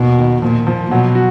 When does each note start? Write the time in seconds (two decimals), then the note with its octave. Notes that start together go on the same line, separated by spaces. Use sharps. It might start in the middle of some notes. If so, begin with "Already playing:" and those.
Already playing: D#2 B2
0.18 D#3
0.42 A#2 F3
0.67 F3
0.91 B2 F#3
1.15 F#4